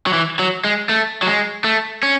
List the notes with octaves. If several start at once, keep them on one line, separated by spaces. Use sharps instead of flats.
F#3
E3
F#3
G#3
A3
F#3
G#3
A3
C#4